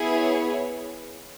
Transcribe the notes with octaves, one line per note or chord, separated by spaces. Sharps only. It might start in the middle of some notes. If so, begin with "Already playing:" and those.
Already playing: B3 E4 G#4
C#5